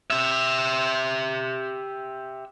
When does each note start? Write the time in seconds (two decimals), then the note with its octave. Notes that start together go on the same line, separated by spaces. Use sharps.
0.10 G4 E5